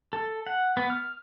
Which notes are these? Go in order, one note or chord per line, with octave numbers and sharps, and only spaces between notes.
A4
F#5
B3
F6